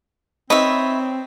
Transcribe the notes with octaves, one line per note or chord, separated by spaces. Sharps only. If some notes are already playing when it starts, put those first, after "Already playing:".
C4 D#4 B4 C#5 E5